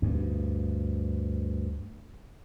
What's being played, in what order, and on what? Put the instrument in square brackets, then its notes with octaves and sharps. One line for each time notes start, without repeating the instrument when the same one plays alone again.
[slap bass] D2 G2